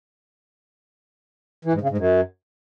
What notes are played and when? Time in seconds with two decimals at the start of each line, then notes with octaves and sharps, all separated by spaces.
1.65 E3
1.73 G#2
1.81 C#3
1.89 G#2
1.98 F#2